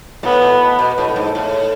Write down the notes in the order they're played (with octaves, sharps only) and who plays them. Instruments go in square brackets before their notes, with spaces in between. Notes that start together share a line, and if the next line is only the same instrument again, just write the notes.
[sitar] A2 [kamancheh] B3
[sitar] B2
B2
A2
A2
G#2
A2